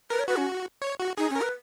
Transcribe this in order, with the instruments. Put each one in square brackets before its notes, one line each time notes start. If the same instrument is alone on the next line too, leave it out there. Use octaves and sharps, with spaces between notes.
[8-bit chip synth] A#4 [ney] B4
[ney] C#5
[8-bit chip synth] F#4 [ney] B4
[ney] C#4
[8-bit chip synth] C#5
F#4
[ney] D#4 [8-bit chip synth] G#4
[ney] C#4
[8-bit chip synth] A#4
[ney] B4